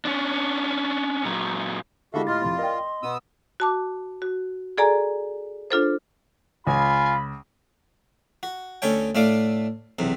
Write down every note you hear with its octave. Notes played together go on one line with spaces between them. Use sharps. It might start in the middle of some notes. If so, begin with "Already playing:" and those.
C#4 D4
A#2 F#3
D3 G#3 E4 F#4 G4 A4 E5 F5
A2 F4 D#5 C6 F6 A6
F1 F2 C6
A#4 D5 D#5 G5
G5
B2 B3 D#6 E6
F#4 A5 D6
F#4
G#4 A4 D5 G#5 A#5
D4 F4 A4 C5
C#2 F4 G#5 B5
F#4
D2 C#4 A4 C#5 G5
A2 A3 D4 F5 D6
B1 E2 C3